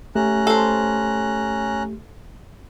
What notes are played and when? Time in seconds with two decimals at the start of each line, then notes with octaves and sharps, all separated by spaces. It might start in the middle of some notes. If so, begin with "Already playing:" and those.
0.15 A3 C#4 G4 A#5 F#6
0.47 A4 C5